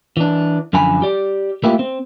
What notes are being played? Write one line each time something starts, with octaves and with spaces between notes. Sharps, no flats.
E3 D4
F#2 D3 F3 G#5 B5
G4 D5
A3 A#3 E4 F4 G4
C4